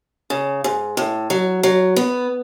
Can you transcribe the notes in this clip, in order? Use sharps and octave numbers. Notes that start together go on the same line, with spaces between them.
C#3
G#2
A2
F#3
F#3
B3